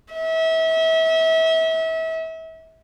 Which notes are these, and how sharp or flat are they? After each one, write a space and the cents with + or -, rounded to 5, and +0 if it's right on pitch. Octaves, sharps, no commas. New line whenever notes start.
E5 -30